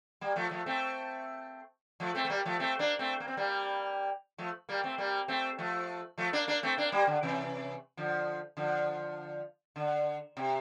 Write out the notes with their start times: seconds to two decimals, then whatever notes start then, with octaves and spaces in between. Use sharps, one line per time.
0.21 G3 A#3
0.36 F3 A3
0.51 F3 A3
0.66 A3 C4
2.00 F3 A3
2.15 A3 C4
2.25 A3
2.30 G3 A#3
2.45 F3 A3
2.59 A3 C4
2.79 A#3 D4
2.99 A3 C4
3.20 A#3
3.28 C4
3.37 G3 A#3
4.38 F3 A3
4.69 G3 A#3
4.83 A3 C4
4.98 G3 A#3
5.28 A3 C4
5.58 F3 A3
6.18 F3 A3
6.33 A#3 D4
6.48 A#3 D4
6.63 A3 C4
6.77 A#3 D4
6.92 G3 A#3
7.07 D3
7.23 C3 E3
7.97 D3 F3
8.57 D3 F3
9.76 D3
10.37 C3